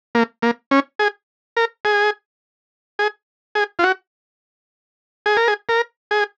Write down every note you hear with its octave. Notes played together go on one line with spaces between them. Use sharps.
A#3
A#3
C#4
G#4
A#4
G#4
G#4
G#4
F4
F#4
G#4
A#4
G#4
A#4
G#4